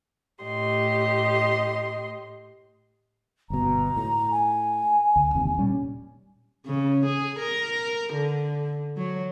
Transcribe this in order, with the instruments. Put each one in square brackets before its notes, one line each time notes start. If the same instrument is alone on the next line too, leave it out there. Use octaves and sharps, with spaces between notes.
[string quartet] A2 G4 D#5 C6
[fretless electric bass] G1 B2 [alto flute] A#5
[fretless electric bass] A2
[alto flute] G#5
[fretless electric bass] D2
E1 D#2 C3
A#2 G3 C#4
[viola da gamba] C#3
G#4
A#4
D3
F#3